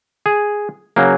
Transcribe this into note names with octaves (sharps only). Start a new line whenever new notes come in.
G#4
C#3 F#3 A#3